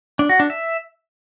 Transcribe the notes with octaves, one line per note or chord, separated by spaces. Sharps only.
D4
F#4
D4
E5